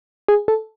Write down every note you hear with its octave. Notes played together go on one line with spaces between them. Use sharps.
G#4
A4